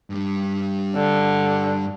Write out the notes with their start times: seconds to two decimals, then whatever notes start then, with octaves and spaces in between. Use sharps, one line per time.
0.10 G2 G3
0.96 D3